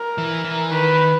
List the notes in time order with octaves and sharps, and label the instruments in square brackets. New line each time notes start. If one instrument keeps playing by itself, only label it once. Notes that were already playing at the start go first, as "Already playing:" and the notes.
Already playing: [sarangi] A#4
[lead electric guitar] E3
E3
[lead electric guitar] D#3 [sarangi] B4